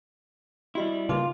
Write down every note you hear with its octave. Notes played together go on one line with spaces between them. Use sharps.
G3 E4 F#4 G4 D#5
C#3 G3 A#3 D#4 F4 B4 D6